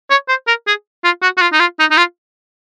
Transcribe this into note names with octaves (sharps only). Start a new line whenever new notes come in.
C#5
C5
A#4
G#4
F4
F#4
F#4
F4
D#4
F4
D#4
D#4
F4